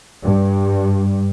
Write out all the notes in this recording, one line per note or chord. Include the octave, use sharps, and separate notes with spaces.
G2